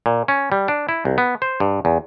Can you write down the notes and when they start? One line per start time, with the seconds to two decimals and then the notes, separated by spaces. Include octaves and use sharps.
0.06 A#2
0.28 C#4
0.52 G3
0.68 D4
0.89 E4
1.05 C2
1.18 B3
1.42 C5
1.60 G2
1.85 E2